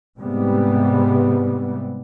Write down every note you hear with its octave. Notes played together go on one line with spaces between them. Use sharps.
G#2 C3 G3 B3